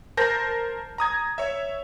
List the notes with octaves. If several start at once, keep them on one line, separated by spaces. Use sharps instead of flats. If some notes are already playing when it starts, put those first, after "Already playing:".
A#4 C5 A5 G6 A#6
A#5 D#6 G#6
C#5 E5